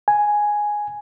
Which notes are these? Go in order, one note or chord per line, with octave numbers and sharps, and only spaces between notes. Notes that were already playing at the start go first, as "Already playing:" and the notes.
G#5